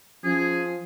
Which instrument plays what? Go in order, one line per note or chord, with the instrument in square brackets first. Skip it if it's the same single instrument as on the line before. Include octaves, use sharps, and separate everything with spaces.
[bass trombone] F3 [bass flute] C#4 [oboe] G#4